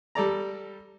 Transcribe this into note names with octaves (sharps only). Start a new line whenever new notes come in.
G3 A4 D5 A#5